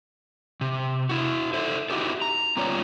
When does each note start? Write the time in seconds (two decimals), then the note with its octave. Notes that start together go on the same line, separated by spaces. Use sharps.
0.61 C3
1.09 E4 F#4
1.54 A4 C5 E5
1.90 D#4 E4 F#4 G4 A4
2.22 A#5
2.57 G3 B3 C#4 F4 C#5 D5